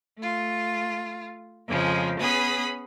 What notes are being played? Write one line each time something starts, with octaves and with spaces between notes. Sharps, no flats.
A3 F4
F2 C#3 F3 G#3
B3 C#4 G#4 B5 D#6